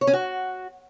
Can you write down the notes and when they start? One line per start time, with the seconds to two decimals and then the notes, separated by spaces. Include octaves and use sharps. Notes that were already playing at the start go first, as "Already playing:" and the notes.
0.01 C#5
0.07 C#4
0.13 F#4